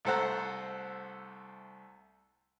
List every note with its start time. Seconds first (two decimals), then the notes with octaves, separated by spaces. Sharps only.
0.05 C2 A3 A4 C5 F#5 A#5